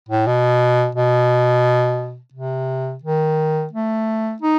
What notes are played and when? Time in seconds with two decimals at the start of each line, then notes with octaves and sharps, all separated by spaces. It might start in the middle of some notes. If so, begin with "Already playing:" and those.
0.09 A2
0.27 B2
0.95 B2
2.34 C3
3.04 D#3
3.73 A3
4.42 D#4